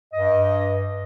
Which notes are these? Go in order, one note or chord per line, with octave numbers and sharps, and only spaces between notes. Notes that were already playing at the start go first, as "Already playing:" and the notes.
G2 D#5